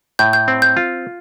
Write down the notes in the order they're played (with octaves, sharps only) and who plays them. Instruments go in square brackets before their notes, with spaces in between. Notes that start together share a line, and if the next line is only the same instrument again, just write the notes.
[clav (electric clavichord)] A2 [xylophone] G6
[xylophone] G6
[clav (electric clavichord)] C4
[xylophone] G6
[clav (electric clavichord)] F4